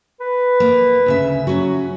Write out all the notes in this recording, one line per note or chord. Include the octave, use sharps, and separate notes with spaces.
B4
A#3
D2 C#3 E5
F#3 C#4 F#4